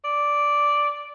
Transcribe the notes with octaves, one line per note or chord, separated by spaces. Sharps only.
D5